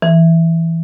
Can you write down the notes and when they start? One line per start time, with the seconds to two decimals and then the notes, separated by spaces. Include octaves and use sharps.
0.02 E3